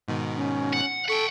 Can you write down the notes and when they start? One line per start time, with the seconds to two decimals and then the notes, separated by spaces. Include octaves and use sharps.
0.08 G#2 B2 D#3
0.36 C#4
0.73 F#5
1.08 A4 F#5 G5 C#6 B6